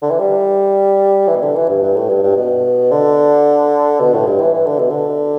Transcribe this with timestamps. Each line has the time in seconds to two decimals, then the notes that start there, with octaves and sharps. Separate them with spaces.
0.02 D3
0.11 E3
0.19 G3
1.28 E3
1.36 B2
1.43 D3
1.56 E3
1.69 G2
1.83 G2
1.96 A2
2.09 G2
2.23 G2
2.37 B2
2.92 D3
4.00 B2
4.14 A2
4.27 G2
4.41 E3
4.54 E3
4.66 D3
4.79 B2
4.90 D3